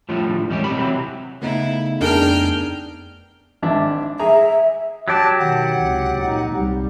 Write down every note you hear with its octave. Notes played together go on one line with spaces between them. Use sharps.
A2 D3 F3 G3
E2 G#2 G3 C#4 G4
B1 A2 C3 B5
C3 E3 F#3 C4
C#3 A3 B3 D#4 E4
F2 D4 G#4 A#4 G5 F6
G#1 D4 E5
G#4 E5 A#5
F#3 G4 D5 A5
B2 D#3 F#5
C#2 C3
A#2 D#4
C2 G3